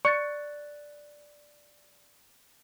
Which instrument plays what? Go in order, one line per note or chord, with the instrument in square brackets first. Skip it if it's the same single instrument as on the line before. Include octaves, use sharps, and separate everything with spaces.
[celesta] D5 F#6 A6 [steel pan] C#6